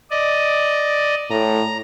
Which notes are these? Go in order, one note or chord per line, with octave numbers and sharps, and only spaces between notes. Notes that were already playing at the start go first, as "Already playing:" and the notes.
D5 D#5
A2 A#5